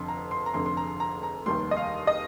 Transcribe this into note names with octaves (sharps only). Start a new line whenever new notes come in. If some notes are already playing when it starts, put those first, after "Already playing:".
Already playing: F1 F2 D3 C6
A#5
C6
A#5
F1 F2 D3 C6
C6
A#5
A#5
A#5
F1 D#2 D#3 G3 A#3 C6
D#5
F5
D#5